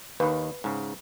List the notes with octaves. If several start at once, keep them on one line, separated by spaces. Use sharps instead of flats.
D#2 D#3 B4
G#2 C#3